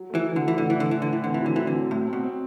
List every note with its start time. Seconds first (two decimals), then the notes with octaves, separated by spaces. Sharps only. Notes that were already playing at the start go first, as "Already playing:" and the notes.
Already playing: F#3
0.10 A3
0.15 E3
0.26 F#3
0.36 D3
0.42 A3
0.48 E3
0.58 A2 D3
0.70 E3 D4
0.80 D3
0.91 E3 D4
1.02 D3
1.08 A2 E3
1.24 D3 C4
1.34 E3
1.41 D3 F#3
1.56 E3 C4
1.67 D3
1.75 F#3
1.90 A2 F#3
2.07 C4
2.13 B2
2.24 C4